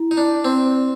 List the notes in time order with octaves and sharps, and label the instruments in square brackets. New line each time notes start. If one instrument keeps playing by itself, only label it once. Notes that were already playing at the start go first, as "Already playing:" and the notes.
Already playing: [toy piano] E4
[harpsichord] D#4
D4
C4